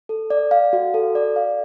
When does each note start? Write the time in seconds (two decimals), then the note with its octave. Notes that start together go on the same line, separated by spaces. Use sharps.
0.09 A4
0.30 D5
0.51 F5
0.73 F#4
0.94 A4
1.15 D5
1.36 F5